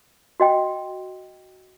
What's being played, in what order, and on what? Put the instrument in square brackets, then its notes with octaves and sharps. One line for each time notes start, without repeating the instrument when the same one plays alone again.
[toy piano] F#4 D#5 G5